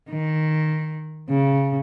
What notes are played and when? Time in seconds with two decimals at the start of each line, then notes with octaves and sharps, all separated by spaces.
0.11 D#3
1.29 C#3